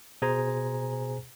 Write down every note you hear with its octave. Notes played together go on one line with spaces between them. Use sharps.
B2 G#4 C5 G#5 A#5